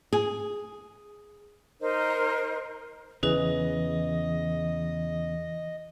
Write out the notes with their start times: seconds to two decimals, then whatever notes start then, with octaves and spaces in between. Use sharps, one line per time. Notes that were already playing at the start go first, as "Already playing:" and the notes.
0.13 G#4
1.81 D#4 A#4 C5 D#5
3.23 E2 C#3 E3 G#4 B4 D#5 F7